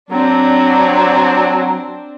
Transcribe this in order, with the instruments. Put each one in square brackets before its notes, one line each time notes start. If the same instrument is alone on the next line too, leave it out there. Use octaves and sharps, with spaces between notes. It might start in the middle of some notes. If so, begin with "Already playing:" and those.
[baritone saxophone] F#3 [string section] C4 D4